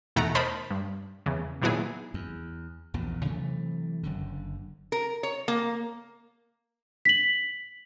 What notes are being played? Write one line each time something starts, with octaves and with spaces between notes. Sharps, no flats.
E2 B2 A3 D#4 F#5 A#5
A#4 C5 D#5 A5 B5
G2
E2 C#3
A#2 D#3 F#3 B3 E4 G#4
E2
A#1 E2 A#2
C3 E3 F#3 A3
F#1 F#2 D3
A#4
C#5
A#3
B6 F#7